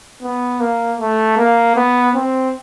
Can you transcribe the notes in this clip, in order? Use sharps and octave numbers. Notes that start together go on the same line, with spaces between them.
B3
A#3
A3
A#3
B3
C4